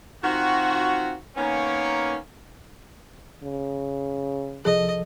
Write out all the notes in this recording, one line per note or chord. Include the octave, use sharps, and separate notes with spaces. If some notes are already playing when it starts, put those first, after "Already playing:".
D#3 C4 F4 F#4
D#3 A#3 B3 C#4
C#3
C2 F3 G#4 A4 D#5